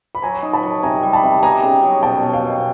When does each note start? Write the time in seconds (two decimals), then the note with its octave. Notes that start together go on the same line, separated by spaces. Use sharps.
0.15 B5
0.22 F#3 G#5 A#5
0.43 D#4
0.53 A5 B5
0.63 F#3
0.83 C3 G#5 A#5
1.03 G3
1.13 A5 B5
1.23 C3
1.43 B3 G#5 A#5
1.63 C#3
1.83 F#3
2.03 B2 G5 A5
2.23 B2
2.33 F5 G5
2.43 B2